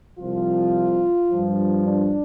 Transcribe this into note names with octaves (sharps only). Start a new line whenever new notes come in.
C2 C3 F3 F4
G2 F3
D4